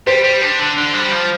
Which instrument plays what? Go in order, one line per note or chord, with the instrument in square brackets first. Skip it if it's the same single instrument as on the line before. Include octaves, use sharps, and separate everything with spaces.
[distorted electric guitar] G3 [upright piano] C5
[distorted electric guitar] G3
D4
D3
D3
G3
F3